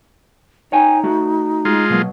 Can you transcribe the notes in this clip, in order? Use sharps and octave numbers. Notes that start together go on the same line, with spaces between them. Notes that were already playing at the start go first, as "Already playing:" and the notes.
D#4 C#5 G5 G#5
A3 F#4
G#3 F4
B2 F#3 A#3